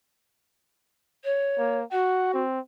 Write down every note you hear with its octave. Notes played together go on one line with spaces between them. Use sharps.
C#5
A#3
F#4 F#5
C4